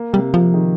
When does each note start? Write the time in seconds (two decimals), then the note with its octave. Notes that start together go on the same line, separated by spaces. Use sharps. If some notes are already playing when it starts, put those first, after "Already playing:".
Already playing: A#3
0.13 C3 G3
0.34 C3 F3
0.54 D#3